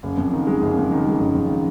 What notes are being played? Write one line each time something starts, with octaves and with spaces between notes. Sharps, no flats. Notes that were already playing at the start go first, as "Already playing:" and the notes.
F#1
F2
D#3
G#3
F#1
F2
D#3
G#3
F#1
F2
D#3